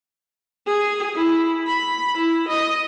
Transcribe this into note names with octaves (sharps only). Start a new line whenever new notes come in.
G#4
E4
B5
E4
D#5